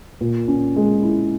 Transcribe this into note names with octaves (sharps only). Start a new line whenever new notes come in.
A#2
C#4
G#3
E4